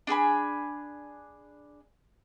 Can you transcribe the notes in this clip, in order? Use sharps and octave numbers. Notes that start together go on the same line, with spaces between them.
D4 G#4 G#5 B5